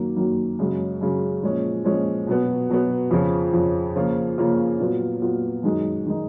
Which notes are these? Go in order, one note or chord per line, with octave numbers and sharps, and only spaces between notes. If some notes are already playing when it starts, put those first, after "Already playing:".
Already playing: F#2 D#3 F#3 A#3
F#2 D#3 F#3 A#3
F#2 C#3 G#3
F#2 C#3 G#3
A#2 F3 G#3 C#4
A#2 F3 G#3 C#4
B2 F#3 B3
B2 F#3 B3
F2 C#3 F3
F2 C#3 F3
C#3 F3 A#3 C#4 F4
C#3 F3 A#3 C#4 F4
A#2 F#3 B3 F4
A#2 F#3 B3 F4
F#2 D#3 G#3 D#4
D#3 G#3 D#4